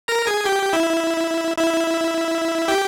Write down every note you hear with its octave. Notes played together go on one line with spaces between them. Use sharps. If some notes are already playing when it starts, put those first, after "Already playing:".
A#4 A#5
G#4 G#5
G4 G5
E4 E5
E4 E5
G4 G5